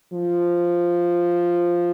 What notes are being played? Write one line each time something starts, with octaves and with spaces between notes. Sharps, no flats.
F3